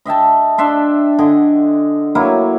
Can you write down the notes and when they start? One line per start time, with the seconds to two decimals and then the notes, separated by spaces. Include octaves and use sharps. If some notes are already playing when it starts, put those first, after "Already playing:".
0.06 D#5 E5 G5 A5
0.58 D4 E5 C6
1.19 D3 D#5 F#5 G#5
2.15 F#3 A#3 E4 C#5